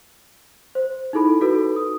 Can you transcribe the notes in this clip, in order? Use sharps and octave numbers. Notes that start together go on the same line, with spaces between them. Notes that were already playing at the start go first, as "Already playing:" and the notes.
C5
D#4 E4 G#4 A4 B5
D#4 F#4 A4 B4
D#6